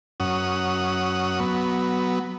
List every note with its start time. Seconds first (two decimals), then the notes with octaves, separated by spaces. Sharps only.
0.20 F#2 C#4 F#5 D#6
1.40 F#3 B3